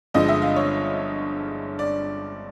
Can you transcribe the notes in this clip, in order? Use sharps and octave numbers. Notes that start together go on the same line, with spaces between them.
G1 G2 D3 F3 G#3 D#5
E5
F5
C#5
D5